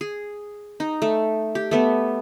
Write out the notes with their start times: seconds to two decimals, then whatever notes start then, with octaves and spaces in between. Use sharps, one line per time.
0.01 G#4
0.80 D#4
1.02 A3
1.55 G4
1.71 A3 B3